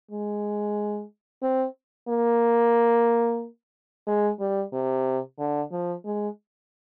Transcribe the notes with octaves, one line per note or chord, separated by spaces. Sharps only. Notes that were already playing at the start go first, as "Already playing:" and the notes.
G#3
C4
A#3
G#3
G3
C3
D3
F3
G#3